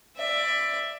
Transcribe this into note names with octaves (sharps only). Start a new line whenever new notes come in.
D5 E5